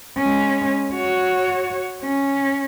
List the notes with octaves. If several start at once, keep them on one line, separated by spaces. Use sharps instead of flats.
G#3 C#4
F#4 C#5
C#4